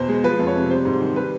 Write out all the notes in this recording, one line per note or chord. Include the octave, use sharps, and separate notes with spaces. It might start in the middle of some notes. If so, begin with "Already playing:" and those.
Already playing: E2 B2 C5
G#3
F3 B4
F2
C#5
C3
G3 C5
G#2
D#3
G3 B4